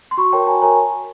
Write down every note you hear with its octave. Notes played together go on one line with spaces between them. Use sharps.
C6
F#4 B5 C#6
A#4 C#5 G5 A5
F#4 G#5 A#5
A#4 C#5 G#5 A#5